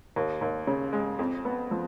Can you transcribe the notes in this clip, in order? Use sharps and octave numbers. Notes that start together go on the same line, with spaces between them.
D#2
D#2
C#3
G#3
F2
B3
F3